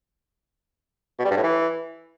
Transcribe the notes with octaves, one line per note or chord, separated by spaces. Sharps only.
B2
G3
G2
A2
E3